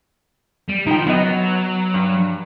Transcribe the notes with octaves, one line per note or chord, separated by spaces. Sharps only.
G3
F3 D#4 E4 G5
F#3 B3 D#5
B3
G2